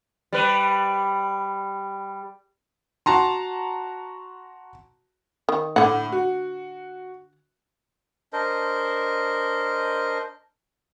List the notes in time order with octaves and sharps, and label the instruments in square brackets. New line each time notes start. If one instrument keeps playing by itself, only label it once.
[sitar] G3 B4
[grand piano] F#4 A5 A#5 C6
[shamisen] D#3
[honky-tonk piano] A2 [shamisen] D3 F#5
[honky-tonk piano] F#4
[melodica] D4 A#4 C5 D#5